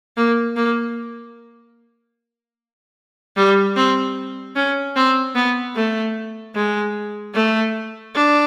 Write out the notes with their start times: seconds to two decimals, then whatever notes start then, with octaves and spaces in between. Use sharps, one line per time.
0.17 A#3
0.56 A#3
3.36 G3
3.76 C4
4.56 C#4
4.96 C4
5.35 B3
5.76 A3
6.55 G#3
7.35 A3
8.15 D4